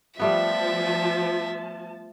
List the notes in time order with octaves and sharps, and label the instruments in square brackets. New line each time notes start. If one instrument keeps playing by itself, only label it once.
[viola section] F3 A5 [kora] G3 A3 B3 [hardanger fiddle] E5